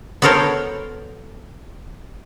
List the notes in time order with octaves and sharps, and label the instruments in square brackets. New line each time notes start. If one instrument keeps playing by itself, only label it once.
[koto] B3 F#4 A4 A#4 C5 C#5